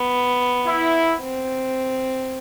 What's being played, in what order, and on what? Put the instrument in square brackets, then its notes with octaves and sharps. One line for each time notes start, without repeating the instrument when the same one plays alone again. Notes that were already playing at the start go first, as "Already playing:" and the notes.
Already playing: [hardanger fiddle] B3
[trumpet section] E4
[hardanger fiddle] C4